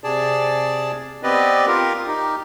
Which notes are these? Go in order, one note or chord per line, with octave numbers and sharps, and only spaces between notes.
C3 G#4 D5 A5
B3 C4 G4 B4 D5 D#5
F4 G4 A#4
D#4 G4